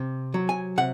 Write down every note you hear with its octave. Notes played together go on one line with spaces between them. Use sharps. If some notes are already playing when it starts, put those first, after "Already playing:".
Already playing: C3
F#3
G#5
C3 F#5